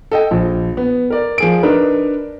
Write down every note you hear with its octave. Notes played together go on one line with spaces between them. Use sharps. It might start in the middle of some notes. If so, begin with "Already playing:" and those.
A4 D#5 G5
A#1
B3
A#4 D5
F3 G#4 D7
D4 D#4 A#4 B4